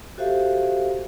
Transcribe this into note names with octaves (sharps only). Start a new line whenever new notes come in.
F#4 G4 A4 C5 E5 F5